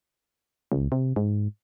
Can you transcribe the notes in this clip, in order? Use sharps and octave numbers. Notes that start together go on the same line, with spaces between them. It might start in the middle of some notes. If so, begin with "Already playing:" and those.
C#2
C3
G#2